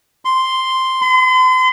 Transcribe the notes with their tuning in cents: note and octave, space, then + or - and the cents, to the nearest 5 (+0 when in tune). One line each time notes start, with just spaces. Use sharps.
C6 -5
C6 -40